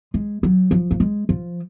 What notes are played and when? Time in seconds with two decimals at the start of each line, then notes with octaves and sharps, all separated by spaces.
0.14 G#3
0.43 F#3
0.71 F3
0.91 A#3
1.00 G#3
1.29 F3